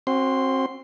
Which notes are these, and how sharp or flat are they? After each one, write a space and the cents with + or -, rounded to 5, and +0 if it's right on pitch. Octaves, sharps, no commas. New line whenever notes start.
C4 +30 F#4 +0 C6 +0